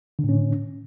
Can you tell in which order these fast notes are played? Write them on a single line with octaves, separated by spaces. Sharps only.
D3 A2 C#4